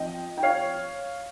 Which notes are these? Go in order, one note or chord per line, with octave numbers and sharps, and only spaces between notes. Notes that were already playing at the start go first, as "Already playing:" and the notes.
Already playing: F3 C4 D#5 G5
G5
C#5 F5